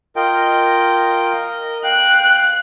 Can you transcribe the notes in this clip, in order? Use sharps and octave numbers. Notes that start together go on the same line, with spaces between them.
F4 A#4 D#5 G5
F5 G5 F#6